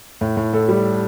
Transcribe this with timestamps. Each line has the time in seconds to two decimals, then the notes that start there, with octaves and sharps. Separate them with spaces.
0.21 A2
0.37 A2
0.53 A2 A4
0.69 G3